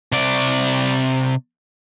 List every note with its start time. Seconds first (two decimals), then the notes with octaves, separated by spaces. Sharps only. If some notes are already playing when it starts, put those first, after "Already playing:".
0.12 C3 D5